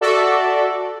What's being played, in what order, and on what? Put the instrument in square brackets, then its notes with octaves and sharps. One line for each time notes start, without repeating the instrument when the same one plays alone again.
[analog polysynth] F#4 A4 D5 E5